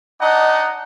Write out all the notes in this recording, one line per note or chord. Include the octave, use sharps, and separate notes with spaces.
D4 D#4 D#5 F#5